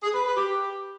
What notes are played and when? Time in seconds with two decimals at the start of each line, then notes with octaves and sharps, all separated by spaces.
0.03 G#4
0.14 B4
0.25 B4
0.37 G4